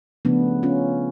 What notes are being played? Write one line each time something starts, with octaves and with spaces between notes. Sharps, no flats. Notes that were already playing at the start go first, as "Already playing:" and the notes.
C#3 F3 A3 B3 D4
C#4 F4